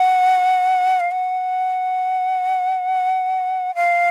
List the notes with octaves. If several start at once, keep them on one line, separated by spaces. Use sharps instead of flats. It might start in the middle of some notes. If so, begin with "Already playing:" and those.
Already playing: F#5
F5
F#5
F5